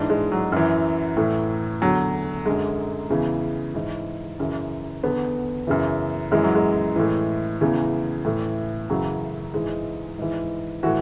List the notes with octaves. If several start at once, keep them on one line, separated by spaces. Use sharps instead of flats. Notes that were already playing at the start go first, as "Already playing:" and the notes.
Already playing: G#2 E3 D4
G#3
F#3
F#2 E3
A2 E3
E2 D3 F#3
F#2 D3 G#3
E2 C#3 E3
G#2 E3
F#2 C#3 E3
E2 D3 B3
F#2 C#3 E3
F#2 E3 G#3
F#3
G#3
A2 E3
E2 C#3 E3
A2 E3
F#2 C#3 E3 F#3
G#2 E3 G#3
G#2 E3
A2 E3 F#4